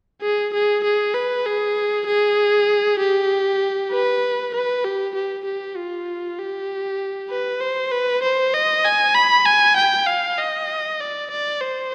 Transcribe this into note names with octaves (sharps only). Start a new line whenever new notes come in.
G#4
G#4
G#4
B4
G#4
G#4
G4
B4
B4
G4
G4
G4
F4
G4
B4
C5
B4
C5
D#5
G#5
B5
G#5
G5
F5
D#5
D5
D5
C5